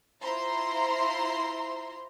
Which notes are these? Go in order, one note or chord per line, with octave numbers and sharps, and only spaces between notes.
E4 F4 C5 A#5 C6